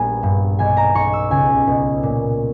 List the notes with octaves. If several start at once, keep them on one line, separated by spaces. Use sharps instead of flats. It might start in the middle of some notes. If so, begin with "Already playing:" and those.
Already playing: A#1 G3 B3 G#5
G2
B1 G#5
A#5
B1 C#6
E6
C#2 G#5
B2
A#2